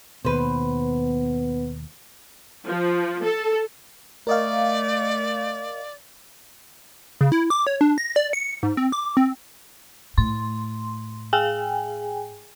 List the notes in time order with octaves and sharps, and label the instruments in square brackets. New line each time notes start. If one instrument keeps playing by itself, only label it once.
[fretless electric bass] D#2 B2 [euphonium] B3 [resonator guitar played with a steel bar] B4 C5
[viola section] F3
A4
[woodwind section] A3 [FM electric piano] A#4 D#5 F5 [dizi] D5
[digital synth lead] C#3
E4
D6
C#5
D4
A#6
D5
C#7
G#2
C4
D6
C4
[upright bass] A2 [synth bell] C6
[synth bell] G#4 G5 G#5